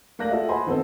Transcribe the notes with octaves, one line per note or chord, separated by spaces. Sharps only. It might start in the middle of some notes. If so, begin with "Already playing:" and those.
A3 A#3 D5 F#6 A#6 F#7
F4 F#4 G#4 A4 D#5 E5
C5 D#5 F#5 G#5 B5 C6
D#3 B3 C4 A4 C5